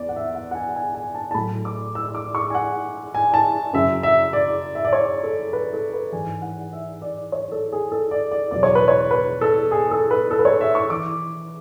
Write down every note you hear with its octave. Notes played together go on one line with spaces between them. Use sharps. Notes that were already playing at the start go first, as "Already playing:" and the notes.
Already playing: E2 D5
F#5
E5
F#5
F#5
G#5
G#5
G#5
A5
A5
A2 F#3 B5
D6
E6
D6
C#6
G#5
F#5
G#5
A5
F#2 C#3 F#3 E5
E5
D5
E5
D5
C#5
A4
B4
A4
B4
G#2 E3 G#5
F#5
E5
D5
C#5
A4
G#4
A4
D5
D5
E2 B2 F#3 D5
C#5
B4
C#5
B4
A4
G#4
A4
B4
A4
B4
C#5
E5
C#6
E3 D6